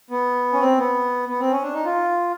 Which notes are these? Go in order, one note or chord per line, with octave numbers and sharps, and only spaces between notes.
B3
C#4
C4
B3
B3
C4
C#4
D4
D#4
F4